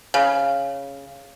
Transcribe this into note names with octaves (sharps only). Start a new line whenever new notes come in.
C#3